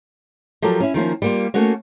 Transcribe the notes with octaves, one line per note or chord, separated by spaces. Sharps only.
F3 F#3 G4 A4 A#4
C#4 E4
D#3 F3 A#3 C#4
G3 A#3 F4
A3 A#3 C#4 F#4 C#5